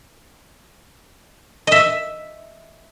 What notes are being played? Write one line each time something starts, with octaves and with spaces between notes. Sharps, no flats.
D#5 E5